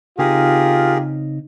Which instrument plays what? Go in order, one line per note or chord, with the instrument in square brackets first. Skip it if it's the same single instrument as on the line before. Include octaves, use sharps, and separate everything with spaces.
[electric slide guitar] C#3 C4 D#4 [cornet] F4 [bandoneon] G4 G#4 A#4